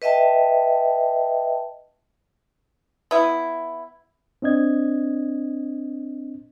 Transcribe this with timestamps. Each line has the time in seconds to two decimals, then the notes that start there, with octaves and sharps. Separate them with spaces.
0.02 B4 D#5 E5 G5 A5
3.11 B3 E4
4.42 C4 D4 D#5 G#6